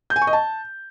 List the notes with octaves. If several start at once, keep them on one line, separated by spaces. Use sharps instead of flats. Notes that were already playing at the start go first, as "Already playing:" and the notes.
G6
G#5
C#6
D#5
A5